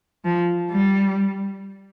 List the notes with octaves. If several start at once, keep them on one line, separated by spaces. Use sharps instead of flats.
F3
G3